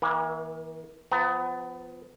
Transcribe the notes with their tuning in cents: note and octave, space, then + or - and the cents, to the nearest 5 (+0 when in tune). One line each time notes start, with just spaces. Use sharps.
E3 -30 A#3 +35
F3 +0 B3 +25 A#5 +0